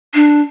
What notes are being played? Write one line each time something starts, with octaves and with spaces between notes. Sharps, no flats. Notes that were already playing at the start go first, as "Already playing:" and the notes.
D4